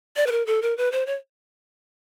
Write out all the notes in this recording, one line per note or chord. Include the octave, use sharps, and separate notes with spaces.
D5
B4
A#4
A4
A#4
B4
C5
C#5